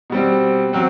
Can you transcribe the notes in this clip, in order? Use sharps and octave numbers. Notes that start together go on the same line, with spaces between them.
B2 G3 C4
F#3 C4